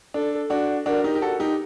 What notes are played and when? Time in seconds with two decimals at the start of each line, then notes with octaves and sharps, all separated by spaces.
0.14 D4 A4
0.50 D4 F#4
0.86 D4 F#4 A#4
1.04 D#4 G4
1.15 G4
1.22 F#4 A4
1.40 D#4 G4